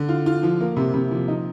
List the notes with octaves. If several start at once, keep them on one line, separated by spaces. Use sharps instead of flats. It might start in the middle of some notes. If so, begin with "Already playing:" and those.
Already playing: D3
F4
F4
F3
A#3
C3
C3
F3
D#4